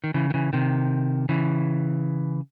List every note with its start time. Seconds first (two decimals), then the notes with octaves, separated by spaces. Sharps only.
0.04 D#3
0.14 C#3 E3
0.30 D#3
0.34 C#3 E3
0.53 C3 D#3
1.29 C#3 E3